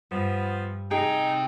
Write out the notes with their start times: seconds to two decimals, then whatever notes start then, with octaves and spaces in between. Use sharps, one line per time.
0.11 G2 F3 B3 C5
0.91 C3 D#4 G#4 G5